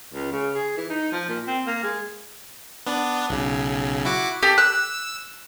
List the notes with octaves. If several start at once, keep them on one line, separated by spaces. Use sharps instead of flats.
C#2
C#3
G#4
E3
D#4
F3
A#2
C4
A#3
G#3
B3 D4
B1 C#3
E4 F#4 D6
G4 A4
E6 F#6